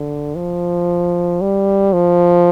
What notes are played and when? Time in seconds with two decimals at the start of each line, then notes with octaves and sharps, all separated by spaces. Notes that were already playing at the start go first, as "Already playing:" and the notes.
Already playing: D3
0.35 F3
1.41 G3
1.93 F3